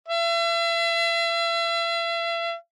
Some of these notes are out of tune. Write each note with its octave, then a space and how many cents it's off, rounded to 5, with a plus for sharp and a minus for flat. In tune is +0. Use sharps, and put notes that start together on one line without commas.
E5 +40